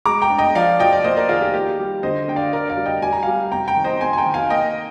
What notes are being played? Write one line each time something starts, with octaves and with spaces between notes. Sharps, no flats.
G#3 A#5 D6
G5 A#5
D4
D#5 G5
F3 D5 F5
F3 D#5 G5
D5
A#3 C5 D#5
A#4 D5
D#3 F4 G#4
G4
A#3 G4
G3
D3 C5 D#5
D4 G5
D5 F5
D4 A#4 D5
D5 F5
G3
D#5 G5
G3 G#5
A#5
G3 F5 G#5
C3 G5 A#5
G5 A#5
D#3
C5 D#5
C4 G#5 C6
G#5
G5 A#5
D#3
F5 G#5
A#3 D#5 G5